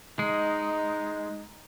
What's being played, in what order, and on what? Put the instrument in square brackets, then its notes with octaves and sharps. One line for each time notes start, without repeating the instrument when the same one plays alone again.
[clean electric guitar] G#3 [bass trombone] D#4